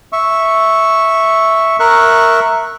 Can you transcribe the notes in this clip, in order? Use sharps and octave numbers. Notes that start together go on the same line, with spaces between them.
E5 C#6
A#4 E5 C#6 F#6